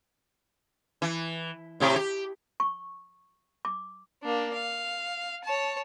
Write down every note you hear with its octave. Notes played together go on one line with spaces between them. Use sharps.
E3
A2 C3 G4
G4
C#6
D6
A#3 D4
F5
C#5 A5